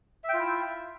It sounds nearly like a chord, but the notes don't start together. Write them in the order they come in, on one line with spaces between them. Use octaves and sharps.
E5 G5 F4 E4